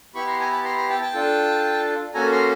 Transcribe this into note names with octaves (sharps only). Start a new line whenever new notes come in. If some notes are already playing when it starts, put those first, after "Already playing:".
B3 E4 G4 B5 C#6
A#5 C6
G#5 A#5
A5 B5
A#5 C6
A#5 C6
G5 A5
G5 A5
D4 F4 A4
A#3 C#4 F#4 A4 G#5 A#5
A#5 C6